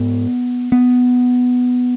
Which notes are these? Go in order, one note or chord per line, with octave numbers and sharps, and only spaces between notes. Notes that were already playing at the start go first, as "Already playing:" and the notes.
Already playing: G#2 B3
B3